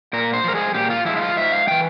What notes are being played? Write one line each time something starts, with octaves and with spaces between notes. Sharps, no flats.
A#2 A#4
C5
F3 G#3 A#4
G#4
A#2 G4
F4
F3 G#3 E4
E4
F4
G#2 E5
F5
E3 G#3 G5